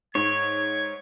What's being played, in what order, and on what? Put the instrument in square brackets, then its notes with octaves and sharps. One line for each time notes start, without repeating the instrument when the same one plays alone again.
[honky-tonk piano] G#2 [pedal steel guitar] C#5 [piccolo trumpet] G#6